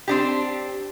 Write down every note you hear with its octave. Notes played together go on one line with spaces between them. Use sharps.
C4 D4 G4